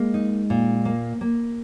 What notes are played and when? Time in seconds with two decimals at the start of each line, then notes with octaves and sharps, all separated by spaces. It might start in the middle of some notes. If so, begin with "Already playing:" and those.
Already playing: G#3 A#3
0.14 D#4
0.50 A#2
0.85 A#3
1.21 A#3